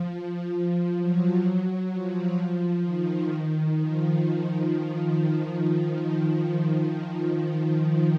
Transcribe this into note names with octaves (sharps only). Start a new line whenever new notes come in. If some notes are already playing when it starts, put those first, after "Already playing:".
Already playing: F3
F#3
F3
D#3
F3